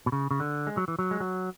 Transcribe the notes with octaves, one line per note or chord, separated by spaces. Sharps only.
B2
C#3
C#3
D3
G#3
F#3
E3
F#3
G#3
F#3